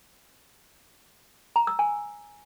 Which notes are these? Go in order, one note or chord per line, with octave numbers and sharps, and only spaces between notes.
A#5
E6
G#5